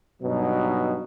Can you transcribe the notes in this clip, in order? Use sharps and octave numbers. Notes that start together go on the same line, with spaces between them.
G2 B2 F#3 D#4